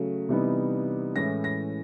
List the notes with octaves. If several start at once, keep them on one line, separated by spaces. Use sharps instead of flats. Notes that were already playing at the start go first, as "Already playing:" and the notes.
Already playing: C#3 F#3 A3
C3 E3 G3 B3 D#4
A2 E3 G#3 C#4 A#6
A#6